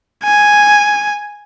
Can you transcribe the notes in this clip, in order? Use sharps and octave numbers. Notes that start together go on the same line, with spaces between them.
G#5